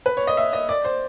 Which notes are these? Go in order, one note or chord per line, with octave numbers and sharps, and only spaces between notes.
B4
C#5
D#5
E5
D#5
D5
C5